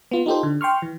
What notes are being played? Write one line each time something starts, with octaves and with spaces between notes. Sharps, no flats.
B3 F4
D#4 F4 G4 A4 C5
D3
G5 C6 C#6 F6
E3